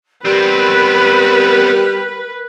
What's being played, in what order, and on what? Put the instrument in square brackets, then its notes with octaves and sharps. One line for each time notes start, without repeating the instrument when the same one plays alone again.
[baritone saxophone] G3 [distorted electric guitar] B3 C4 [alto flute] A#4 [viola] B4